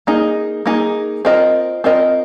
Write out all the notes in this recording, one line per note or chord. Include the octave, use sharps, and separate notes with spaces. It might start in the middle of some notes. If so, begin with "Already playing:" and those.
A#3 D#4 G#4
A#3 D#4 G#4
C4 F4 A#4 D#5
C4 F4 A#4 D#5